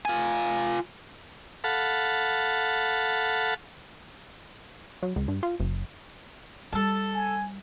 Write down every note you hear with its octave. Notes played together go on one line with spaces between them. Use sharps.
F4 G#5
A4 F5 F#5 A5 B5
F#3
C#2
G2
F4
F#1
G3 A4 A5
G#5